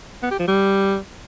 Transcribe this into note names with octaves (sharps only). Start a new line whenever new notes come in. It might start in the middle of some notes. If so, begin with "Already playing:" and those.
B3
G4
F3
G3